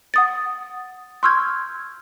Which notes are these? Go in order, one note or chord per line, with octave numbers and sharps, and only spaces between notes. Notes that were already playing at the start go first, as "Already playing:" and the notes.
F#5 D#6 A6
C6 C#6 E6 F6 G6 G#6